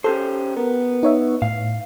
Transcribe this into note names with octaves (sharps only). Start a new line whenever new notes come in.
C#4 G4 A4 C5
B3 A#4
D#4 C#5 E5
A2 F5